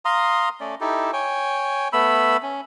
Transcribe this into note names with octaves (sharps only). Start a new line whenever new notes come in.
F5 A#5 C6 D#6
A3 C#4 D5
D#4 E4 G4 A4
C#5 G5 G#5
A3 B3 B5 E6
C#4